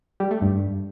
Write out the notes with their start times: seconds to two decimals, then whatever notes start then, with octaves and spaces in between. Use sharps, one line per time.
0.20 G3
0.31 A3
0.42 G2